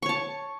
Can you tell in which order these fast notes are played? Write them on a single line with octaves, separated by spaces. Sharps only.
C#6 C#5 A5